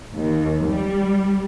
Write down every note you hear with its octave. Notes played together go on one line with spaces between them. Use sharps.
D#2
G3